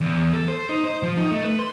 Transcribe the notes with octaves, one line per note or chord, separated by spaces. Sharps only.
E2
E2
A4
C5
D#4
C5
F3
D#4
A3
B4
C6